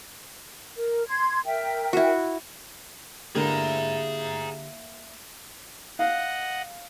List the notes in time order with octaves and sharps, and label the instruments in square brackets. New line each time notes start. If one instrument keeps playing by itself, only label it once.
[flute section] A#4
C6 G#6
A#4 E5 G5
[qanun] E4 F#4
[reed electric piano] D3 G4 [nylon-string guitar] A#3 E4 [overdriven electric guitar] G#4 A#5
[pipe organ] D#5 F#5 [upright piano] F5